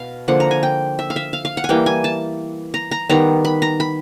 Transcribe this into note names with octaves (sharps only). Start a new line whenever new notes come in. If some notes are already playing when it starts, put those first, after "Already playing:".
Already playing: B2 F5
D3 F3 A#3 F#5
A#5
G#5
G5
E5
F5
E5
F5
F5
F#5
G#5
E3 G3 A#3 G5
G#5
A5
A#5
A#5
D#3 G3 B3 A#5
B5
A#5
B5